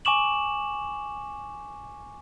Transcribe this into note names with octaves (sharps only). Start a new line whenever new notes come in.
G#5 C#6 D6 E7 F#7